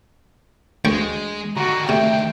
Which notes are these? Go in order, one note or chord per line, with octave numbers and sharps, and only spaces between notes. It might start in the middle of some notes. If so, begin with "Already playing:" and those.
D2 G#3 G5 C#6
D3 D#3 F#4 A#5
C3 A3 E5 G5